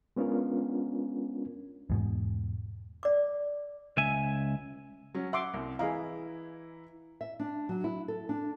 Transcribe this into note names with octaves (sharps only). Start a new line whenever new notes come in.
G#3 B3 C#4 D4 F4 A#4
E2 G#2 B2
D5 D6
C#2 E5 G#5
F#3 C#4
E5 F#5 C6 D6
C2
E3 E4 G#4 D#5 F5 A#5
E5
D4
F#3
E4
A4
D4